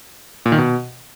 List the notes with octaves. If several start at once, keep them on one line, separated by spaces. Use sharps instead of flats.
A#2
D#3
B2